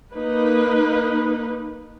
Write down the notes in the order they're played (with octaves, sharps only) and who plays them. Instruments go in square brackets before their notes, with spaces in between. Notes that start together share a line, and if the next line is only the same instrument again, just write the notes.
[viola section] A#3 D#4 B4